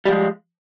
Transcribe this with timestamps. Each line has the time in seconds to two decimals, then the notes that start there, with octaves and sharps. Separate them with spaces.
0.05 G3
0.08 F3
0.11 G#3